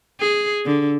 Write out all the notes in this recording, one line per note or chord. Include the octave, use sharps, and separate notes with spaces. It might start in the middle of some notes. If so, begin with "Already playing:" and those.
G#4
D3